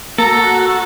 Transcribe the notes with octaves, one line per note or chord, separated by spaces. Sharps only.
A#3 F#4 A4 A#5